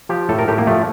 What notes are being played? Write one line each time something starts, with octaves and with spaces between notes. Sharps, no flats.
F3 G4
A2 A4
A#4
A2 G4
A#3
F3 A3